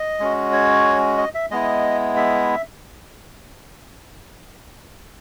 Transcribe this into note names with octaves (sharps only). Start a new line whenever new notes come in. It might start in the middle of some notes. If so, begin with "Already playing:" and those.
Already playing: D#5
G#3 C#4 F#4
C#5
D#5
E5
G#3 B3 E4 D#5
E5